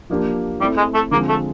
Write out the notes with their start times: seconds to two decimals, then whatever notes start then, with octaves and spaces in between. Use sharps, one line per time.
0.10 F3 A#3 D4 G4
0.60 G3 A3 C4 E4
0.77 G#3
0.94 A3
1.11 D3 F3 G#3 A#3 C4
1.29 A3